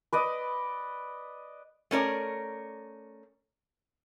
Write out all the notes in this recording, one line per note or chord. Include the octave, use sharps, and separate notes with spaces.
B4 D5 D#5
A3 C#4 A#4 D5